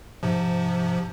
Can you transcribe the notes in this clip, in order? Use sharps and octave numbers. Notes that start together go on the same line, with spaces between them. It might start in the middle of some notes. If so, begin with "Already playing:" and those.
G#2 C3 F3